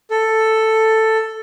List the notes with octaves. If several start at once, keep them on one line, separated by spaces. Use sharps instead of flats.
A4